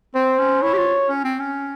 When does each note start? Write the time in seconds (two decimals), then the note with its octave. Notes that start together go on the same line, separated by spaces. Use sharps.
0.15 C4 C5
0.39 C#4
0.62 E4 C#5
0.73 G4
0.78 F4
1.09 C#4
1.24 C4
1.40 C#4